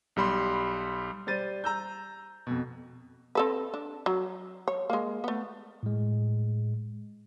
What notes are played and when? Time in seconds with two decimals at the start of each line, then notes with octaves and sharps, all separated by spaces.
0.16 B1 G3 B5 C6
1.27 G3 C5 A6 D#7
1.64 A#5 E6 G6
2.47 F2 B2
3.35 C4 A4 B4
3.74 D4
4.06 F#3
4.68 C#5
4.90 G#3 A#3
5.24 A3 B3
5.83 A2 G#3